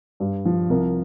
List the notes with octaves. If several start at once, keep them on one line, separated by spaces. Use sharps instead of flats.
G2
F3
C2 A#4